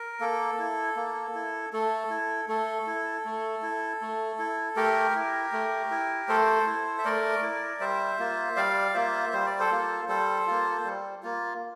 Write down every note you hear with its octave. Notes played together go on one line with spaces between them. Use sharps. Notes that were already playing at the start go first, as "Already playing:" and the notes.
Already playing: A#4
A#3 A4
E4
A#3
E4
A3 A4
E4
A3 A4
E4
A3
E4
A3
E4
A3 G4 A#4
E4
A3
E4
A3 A4 C5
E4
E5
A3 A#4 D5
E4
G3 C5 E5
A#3 F4
G3 D5 F5
A#3 F4 C5 E5
G3 C5
D5
A4 C5
A#3 F4
G3 A4 C5
A#3 F4
G3
A#3 F4